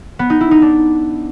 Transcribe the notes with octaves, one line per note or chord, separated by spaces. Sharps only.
B3
D#4
E4
D#4
D4